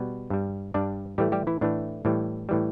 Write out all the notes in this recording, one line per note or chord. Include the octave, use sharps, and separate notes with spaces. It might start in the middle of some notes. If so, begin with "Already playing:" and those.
Already playing: B2 G3 B3 B4
G2 G3
G2 G3 D4 D5
A2 E3 G3 A3 G4
G3 G4
E3 E4
A2 E3 A3 D4
A2 E3 G3
A2 E3 G3